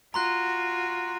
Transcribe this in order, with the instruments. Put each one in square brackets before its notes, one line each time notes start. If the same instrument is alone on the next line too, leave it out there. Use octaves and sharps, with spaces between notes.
[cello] F4 F#4 [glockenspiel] A#5 C6 F#6